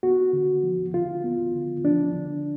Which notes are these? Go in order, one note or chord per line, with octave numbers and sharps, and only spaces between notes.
B3 F#4
D3
F3
D3 F4
B3
D3
F3 D4
D3